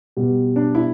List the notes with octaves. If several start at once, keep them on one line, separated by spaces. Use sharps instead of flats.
B2 G3
D4
E4